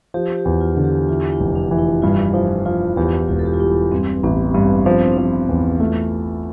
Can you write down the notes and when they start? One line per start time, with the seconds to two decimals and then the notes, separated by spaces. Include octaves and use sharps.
0.14 F3 G4
0.38 G4
0.45 E2
0.61 F4
0.77 D3
0.84 G4
1.09 E3 F4
1.32 E4
1.40 F1
1.55 D4
1.71 E3
1.79 E4
2.02 G2 F4
2.34 F3 E4
2.66 F3 F4
2.97 E2 G4
3.28 E1 F4
3.39 A4
3.46 G4
3.54 F4
3.60 G3 E4
3.91 G2 C4
4.23 A1 B3
4.54 G2 C4
4.85 F3 D4
4.98 C4
5.12 D4
5.18 F3
5.49 E2
5.80 A3 F4